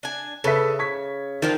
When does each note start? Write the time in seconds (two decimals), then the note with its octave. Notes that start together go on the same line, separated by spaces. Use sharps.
0.03 D4 G#5
0.44 C#3 A4 B4 E5
0.79 C#6 G#6 B6
1.42 D#3 F3 D4 F4